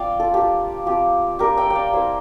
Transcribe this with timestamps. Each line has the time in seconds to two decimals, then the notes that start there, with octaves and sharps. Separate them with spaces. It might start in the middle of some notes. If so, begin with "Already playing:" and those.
Already playing: F3 C4 D5 F5 G5
0.20 F4 A4
0.33 A#3 D4 F4 G4
0.86 F3 C4 F4 G4
1.39 G3 D4 F4 G4 A#4
1.57 E5 G5
1.70 G5
1.75 D5 F5
1.93 G3 C4 E4 C5 E5